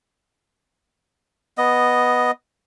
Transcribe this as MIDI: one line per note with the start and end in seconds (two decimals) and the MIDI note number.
1.58 2.31 59
1.58 2.31 75